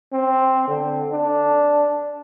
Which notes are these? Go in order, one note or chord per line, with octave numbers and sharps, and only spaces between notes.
C4
D3
D4